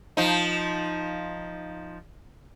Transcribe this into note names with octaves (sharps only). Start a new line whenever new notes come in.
F3 D#4